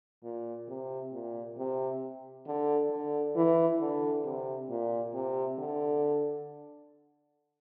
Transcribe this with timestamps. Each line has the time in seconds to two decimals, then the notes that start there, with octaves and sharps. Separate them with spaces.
0.24 A#2
0.68 C3
1.13 A#2
1.58 C3
2.47 D3
2.91 D3
3.36 E3
3.80 D3
4.25 C3
4.70 A#2
5.14 C3
5.59 D3